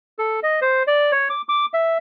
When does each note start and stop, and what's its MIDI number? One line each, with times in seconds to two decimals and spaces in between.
0.19 0.40 69
0.43 0.60 75
0.62 0.83 72
0.87 1.12 74
1.12 1.29 73
1.30 1.42 86
1.49 1.66 86
1.73 1.98 76